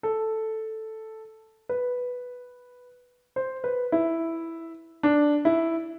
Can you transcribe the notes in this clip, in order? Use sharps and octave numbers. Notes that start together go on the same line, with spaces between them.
A4
B4
C5
B4
E4
D4
E4